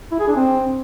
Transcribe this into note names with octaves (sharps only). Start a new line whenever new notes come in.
E4
G#4
D4
C4